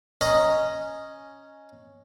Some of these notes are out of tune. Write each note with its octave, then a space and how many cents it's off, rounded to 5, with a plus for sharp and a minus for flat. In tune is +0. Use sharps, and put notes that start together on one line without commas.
C#4 +0 D#5 +0 A#5 +0